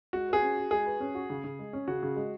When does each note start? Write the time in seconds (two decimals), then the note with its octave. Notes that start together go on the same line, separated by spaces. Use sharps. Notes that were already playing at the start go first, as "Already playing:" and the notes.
0.13 G#3 F#4
0.28 G#4 B4
0.42 C#4
0.57 F#4
0.71 G#3 G#4
0.86 B4
1.00 C#4
1.15 F#4
1.30 C#3
1.44 C#3
1.59 G#3
1.73 C#4
1.88 C#3 F#4
2.03 C#3
2.16 G#3